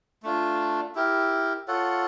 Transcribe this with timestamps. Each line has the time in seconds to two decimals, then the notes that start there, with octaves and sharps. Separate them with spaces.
0.23 A3 D4 F4
0.95 E4 G4 A#4
1.68 F4 A4 C#5 F#5